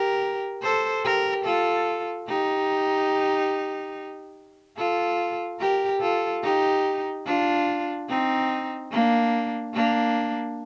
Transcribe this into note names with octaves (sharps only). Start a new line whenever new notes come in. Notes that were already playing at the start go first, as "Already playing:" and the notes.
Already playing: G4 A#4
A4 C5
G4 A#4
F4 A4
D#4 G4
F4 A4
G4 A#4
F4 A4
D#4 G4
D4 F4
C4 D#4
A#3 D4
A#3 D4